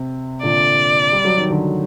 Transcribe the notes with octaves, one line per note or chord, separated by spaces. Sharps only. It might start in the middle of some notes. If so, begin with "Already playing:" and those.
Already playing: C3
A#2 D3 D5
G3
F#3
D#3
D3 F#3